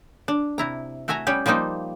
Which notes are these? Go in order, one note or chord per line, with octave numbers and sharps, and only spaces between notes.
D4
C3 E4 A#5
A3 F#4 E5 G#5 A#5
G3 B3 C#4 G4
F3 G3 A#3 D#4 C5